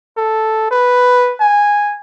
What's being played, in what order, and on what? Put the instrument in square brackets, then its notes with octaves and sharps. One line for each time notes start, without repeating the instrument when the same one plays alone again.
[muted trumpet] A4
B4
G#5